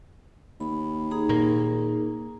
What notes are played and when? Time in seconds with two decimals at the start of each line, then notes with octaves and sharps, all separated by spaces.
0.60 D#2 B5
1.11 D#4 G#4 A#5
1.29 A#2 A#3